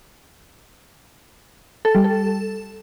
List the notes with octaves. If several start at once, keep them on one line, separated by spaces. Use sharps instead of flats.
A4
G3
A4